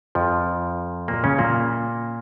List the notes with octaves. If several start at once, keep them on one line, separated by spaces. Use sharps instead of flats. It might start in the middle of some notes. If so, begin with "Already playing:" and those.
F2 F3
A#2 A#3
C#3 C#4
A#2 A#3